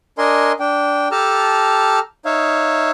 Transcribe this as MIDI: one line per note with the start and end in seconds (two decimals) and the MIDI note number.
0.18 0.52 62
0.18 0.52 70
0.18 0.52 75
0.18 0.52 80
0.18 0.52 84
0.60 1.08 62
0.60 1.08 79
1.11 1.99 67
1.11 1.99 69
1.11 1.99 81
1.11 1.99 82
1.11 1.99 89
2.25 2.91 63
2.25 2.91 73
2.25 2.91 76
2.25 2.91 77